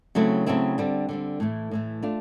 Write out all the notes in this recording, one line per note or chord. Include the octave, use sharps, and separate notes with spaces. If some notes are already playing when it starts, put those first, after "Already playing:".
C#3 F#3 A3 C4 E4
C#3 F#3 A3 C4 E4
D3 G3 C4
D3 G3 C4
A2 E3 A3
A2 E3 A3
A3 D4 F4